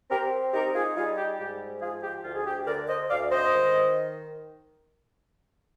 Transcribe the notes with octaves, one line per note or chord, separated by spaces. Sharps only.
C4 G4 A#4
D#4 G4 A#4
F4 G#4
G3 F4 G#4
G4
G#2 G4
F3 F4 G#4
G4
D2 F4
G#4
G4
D3 A#4 D5
C5 D#5
D2 D5 F5
C5 D#5
D#3